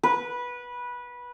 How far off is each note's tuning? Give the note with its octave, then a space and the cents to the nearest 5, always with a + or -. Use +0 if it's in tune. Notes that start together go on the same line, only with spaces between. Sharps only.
B4 -15